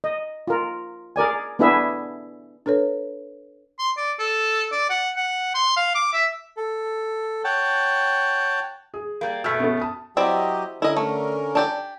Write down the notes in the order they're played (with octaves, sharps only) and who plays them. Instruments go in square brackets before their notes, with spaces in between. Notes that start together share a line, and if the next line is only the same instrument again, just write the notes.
[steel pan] D#5
F4 A#4
G#4 A#4 D5 G#5
B3 D4 E4 G#4 B4 E5
[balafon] D4 A4 B4 C#5
[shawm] C6
D5
A4
D5
F#5
F#5
C6
F5
D6
E5
[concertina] A4
C#5 F#5 G5 A5
[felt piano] G#4
[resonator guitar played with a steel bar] G3 A#3
[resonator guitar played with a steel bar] B2 A3 [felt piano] E6 F6 B6
[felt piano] B3 C#4 A4
A5 D#6
[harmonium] F#3 G4 D#5 [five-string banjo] C4 E4 D5
[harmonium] D3 C#4 A#4 [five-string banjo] E4 D#5
[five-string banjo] A3
D4 G4 D5